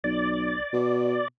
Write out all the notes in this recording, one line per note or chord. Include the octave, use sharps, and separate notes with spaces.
B1 D5
B2